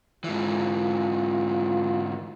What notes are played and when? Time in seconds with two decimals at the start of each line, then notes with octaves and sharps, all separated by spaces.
0.24 G#2 E3 F4